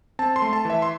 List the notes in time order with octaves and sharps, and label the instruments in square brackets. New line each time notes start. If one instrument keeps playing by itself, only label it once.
[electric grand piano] C4 A5
C6
A3
A5
E3 E5
C6